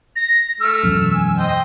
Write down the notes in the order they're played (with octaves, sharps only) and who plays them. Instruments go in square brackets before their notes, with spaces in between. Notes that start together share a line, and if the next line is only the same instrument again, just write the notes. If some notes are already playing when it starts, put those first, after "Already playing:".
[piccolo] A#6
[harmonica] A3 F6 [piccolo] E6
[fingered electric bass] E1 F#2
[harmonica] G#5
C5 D#5 G5